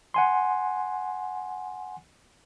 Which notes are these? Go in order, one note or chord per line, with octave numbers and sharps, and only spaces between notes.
F#5 G#5 C6